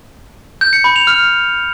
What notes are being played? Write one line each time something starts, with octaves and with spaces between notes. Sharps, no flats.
G6
C#7
B5
F7
F6